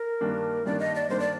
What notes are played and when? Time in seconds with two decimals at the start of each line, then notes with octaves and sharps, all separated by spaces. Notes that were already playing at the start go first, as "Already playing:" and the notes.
Already playing: A#4
0.21 G2 D#3 A#3 D4
0.66 G2 D#3 A#3 D4 D5
0.79 D#5
0.95 D5
1.09 G2 D#3 A#3 D4 C5
1.20 D5